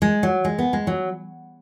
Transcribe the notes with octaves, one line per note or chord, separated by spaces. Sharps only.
G#3
F#3
G#3
B3
G#3
F#3